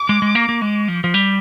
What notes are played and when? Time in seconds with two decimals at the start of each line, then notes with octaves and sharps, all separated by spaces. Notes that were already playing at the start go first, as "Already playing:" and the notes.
Already playing: D6
0.09 G#3
0.22 G#3
0.35 A#3
0.49 A#3
0.62 G#3
0.88 F3
1.04 F3
1.14 G3